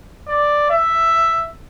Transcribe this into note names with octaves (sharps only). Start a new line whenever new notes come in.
D5
E5